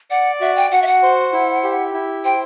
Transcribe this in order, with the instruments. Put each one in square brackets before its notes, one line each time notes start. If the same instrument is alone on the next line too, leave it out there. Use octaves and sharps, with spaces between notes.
[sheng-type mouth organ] D5 [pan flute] F#5
[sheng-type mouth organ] F#4 [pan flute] E5
[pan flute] G5
[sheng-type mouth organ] F#4 [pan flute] F#5
[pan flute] E5
F#5
[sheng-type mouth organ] C5
E4
G4
E4
[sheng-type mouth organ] C5 [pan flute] G5